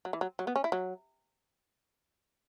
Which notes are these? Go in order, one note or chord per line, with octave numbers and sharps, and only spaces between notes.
F#3
E3
F#3
F#3
B3
C#4
E4
F#3